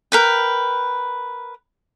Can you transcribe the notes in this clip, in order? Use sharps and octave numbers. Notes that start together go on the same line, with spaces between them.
A#4 B4 G5